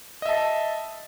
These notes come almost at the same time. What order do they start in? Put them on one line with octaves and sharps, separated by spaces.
D#5 E5 A5